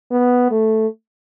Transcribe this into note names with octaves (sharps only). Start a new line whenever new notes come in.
B3
A3